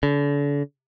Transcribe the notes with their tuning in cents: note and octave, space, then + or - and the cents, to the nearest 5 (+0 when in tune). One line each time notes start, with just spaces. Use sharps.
D3 -40